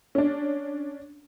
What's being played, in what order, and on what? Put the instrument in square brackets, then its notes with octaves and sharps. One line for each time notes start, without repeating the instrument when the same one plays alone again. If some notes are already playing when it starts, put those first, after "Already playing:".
[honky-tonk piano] C#4 D4